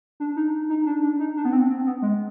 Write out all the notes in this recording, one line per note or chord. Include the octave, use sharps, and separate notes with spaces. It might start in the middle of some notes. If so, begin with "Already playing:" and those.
D4
D#4
D#4
D4
D4
D#4
D4
B3
C4
C4
B3
G#3